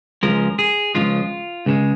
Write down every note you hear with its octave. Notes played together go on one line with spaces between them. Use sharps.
C#2 C#3 F3 G#3 A#4
G#4
C#2 C#3 F3 G#3 F4
C#2 C#3 G#3